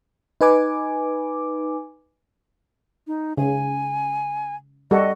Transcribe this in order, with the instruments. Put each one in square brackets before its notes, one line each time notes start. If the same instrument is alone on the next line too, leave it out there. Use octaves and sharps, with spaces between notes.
[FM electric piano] D#4 B4 G#5 D6
[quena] D#4
[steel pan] C#3 [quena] G#5
[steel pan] G3 F#4 A4 [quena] D#5